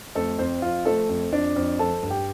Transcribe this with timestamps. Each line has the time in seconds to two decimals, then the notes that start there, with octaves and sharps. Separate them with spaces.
0.15 F2 A3 A4
0.39 F2 C4 C5
0.62 F2 F4
0.85 F3 A3 A4
1.09 F2
1.32 F2 D4 D5
1.56 F2
1.79 F3 A4 A5
2.03 G2
2.10 G4 G5